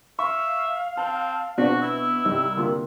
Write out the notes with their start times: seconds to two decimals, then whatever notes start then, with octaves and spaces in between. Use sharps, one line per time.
0.19 E5 F5 C#6
0.97 C4 A5
1.58 B2 C4 D4 F#4
1.82 E4 E6
2.25 C2 C3 D#4
2.57 D3 A#3 F4